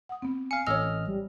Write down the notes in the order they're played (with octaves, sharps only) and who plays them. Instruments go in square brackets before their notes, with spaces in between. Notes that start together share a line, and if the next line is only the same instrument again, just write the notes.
[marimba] F#5 D#6
B3 C4
[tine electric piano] F5 C#7 [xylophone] G#5
[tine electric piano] A1 D#5 F6 [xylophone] C#5 E6
[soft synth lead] G3